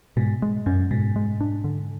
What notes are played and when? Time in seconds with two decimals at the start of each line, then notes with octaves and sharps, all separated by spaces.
0.17 G#2 B2
0.42 G#3
0.66 F#2 C#4
0.91 G#2 B2
1.16 G#3
1.41 D4
1.64 D3